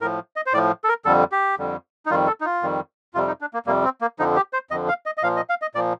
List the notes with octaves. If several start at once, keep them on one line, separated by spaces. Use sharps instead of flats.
A2 F3 A#4
D#5
C5
A2 F3 D5
A4
A#4
F2 D3 G3 A4
G4
F2 D3 G3
D#4
F2 D#3 G3 F4
A4
D#4
F4
F2 D#3 G3
F2 C3 G3 F4
D#4
D4
A#3
F2 C3 G3 A#3
C4
A#3
F2 D3 F3 D#4
G4
C5
F2 D3 F3 D#5
F5
D#5
D#5
A#2 F3 F5
D#5
F5
D#5
A#2 F3 D5